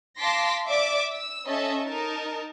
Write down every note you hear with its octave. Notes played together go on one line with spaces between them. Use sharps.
F5 A5 C6 D6 A#6 B6
D5 E5 D6
E6
C#4 A4 D#5 E5 A5
D#4 A#4 A5